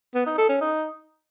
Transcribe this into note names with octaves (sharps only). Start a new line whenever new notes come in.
B3
D#4
A4
C#4
D#4